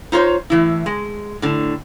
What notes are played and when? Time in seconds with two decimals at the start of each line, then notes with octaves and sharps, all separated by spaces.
0.12 D#4 F4 C5 C#5
0.50 A2 E3 E4
0.86 G#3
1.42 A2 D3